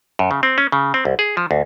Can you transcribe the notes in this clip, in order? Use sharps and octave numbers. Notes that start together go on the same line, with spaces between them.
F#2
C#3
C4
C#4
C#3
C4
C2
G#4
F3
D2